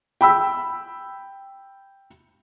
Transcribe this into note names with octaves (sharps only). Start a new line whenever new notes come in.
G5 B5 E6